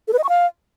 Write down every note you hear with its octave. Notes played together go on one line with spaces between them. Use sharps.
A4
B4
D#5
C#6
F5